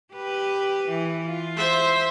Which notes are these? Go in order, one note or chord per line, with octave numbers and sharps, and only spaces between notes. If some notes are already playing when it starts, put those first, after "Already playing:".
G4 B4
E3
F4
C5 E5